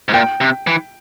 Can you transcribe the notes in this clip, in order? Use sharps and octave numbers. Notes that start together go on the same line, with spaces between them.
G#2
A#2 G5
C3
E3